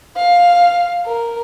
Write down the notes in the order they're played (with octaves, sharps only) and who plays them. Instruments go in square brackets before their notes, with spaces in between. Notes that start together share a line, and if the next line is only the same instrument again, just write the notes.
[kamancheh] F5
A#4